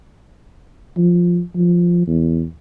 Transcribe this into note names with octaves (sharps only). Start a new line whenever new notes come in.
F3
F3
E2